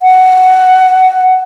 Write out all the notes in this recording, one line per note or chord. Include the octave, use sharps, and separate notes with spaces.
F#5